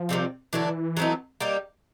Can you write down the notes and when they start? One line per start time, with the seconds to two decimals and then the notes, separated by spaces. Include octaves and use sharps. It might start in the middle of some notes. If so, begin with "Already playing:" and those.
Already playing: F3
0.09 C3 D#3 G3 C4
0.53 D3 E3 F#3 A3 D4
0.97 F#3 A3 C4 D#4
1.40 G3 A#3 D#4 G4